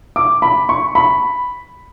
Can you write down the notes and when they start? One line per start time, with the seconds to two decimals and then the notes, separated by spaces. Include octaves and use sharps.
0.16 D6
0.42 B5
0.69 C#6
0.95 B5